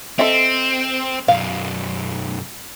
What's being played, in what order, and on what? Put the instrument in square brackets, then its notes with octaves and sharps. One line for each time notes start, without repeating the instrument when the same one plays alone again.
[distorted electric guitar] C4 [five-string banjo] A4 D#5 E5
[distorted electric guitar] B1 F#2 [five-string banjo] F5